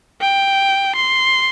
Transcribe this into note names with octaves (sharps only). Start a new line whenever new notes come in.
G5
C6